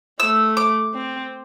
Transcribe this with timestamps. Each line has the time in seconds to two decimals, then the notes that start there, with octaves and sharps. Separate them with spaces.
0.20 A3 E6
0.57 D6
0.94 C4